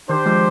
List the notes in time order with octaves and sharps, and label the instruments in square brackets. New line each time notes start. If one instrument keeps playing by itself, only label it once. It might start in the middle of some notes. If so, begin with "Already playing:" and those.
[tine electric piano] D#3 [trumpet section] D4 G4 C5
[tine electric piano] F3 G#3